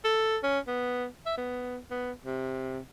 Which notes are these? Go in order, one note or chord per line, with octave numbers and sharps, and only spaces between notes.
A4
C#4
B3
E5
B3
B3
C3